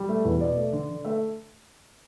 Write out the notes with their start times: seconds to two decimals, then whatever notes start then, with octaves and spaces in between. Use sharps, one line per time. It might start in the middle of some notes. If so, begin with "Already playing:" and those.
Already playing: G3
0.09 A3
0.25 E2
0.40 B2 D5
0.57 A3
0.73 D3
0.89 D3
1.05 A3 E5